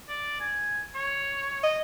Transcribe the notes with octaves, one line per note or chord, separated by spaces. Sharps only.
D5
G#5
C#5
D#5